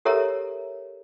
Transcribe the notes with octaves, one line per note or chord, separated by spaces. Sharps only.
G4 A4 A#4 C#5 E5 A#5